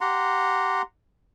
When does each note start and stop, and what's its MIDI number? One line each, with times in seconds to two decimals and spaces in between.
0.01 0.82 67
0.01 0.82 78
0.01 0.82 82
0.01 0.82 84